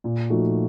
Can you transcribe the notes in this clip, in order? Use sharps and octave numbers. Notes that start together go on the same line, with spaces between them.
A#2
F3 A3 D#4 F#4